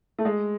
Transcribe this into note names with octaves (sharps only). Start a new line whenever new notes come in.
A3
G#3